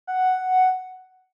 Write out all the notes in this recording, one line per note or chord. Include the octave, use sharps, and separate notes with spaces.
F#5